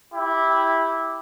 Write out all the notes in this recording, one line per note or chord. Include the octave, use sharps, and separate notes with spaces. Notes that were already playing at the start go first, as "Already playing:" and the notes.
E4 G4